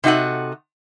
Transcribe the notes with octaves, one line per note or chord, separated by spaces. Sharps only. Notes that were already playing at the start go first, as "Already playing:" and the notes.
C3 D#4 F#4 A4 F#5